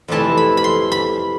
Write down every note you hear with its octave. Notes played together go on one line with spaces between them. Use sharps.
F2 C3 E3 A3 E4 A5
B5
B5
C6
B5